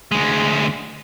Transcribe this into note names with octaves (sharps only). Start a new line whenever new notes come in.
D2 G#3